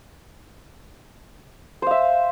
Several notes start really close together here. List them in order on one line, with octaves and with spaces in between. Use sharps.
C5 F5 E5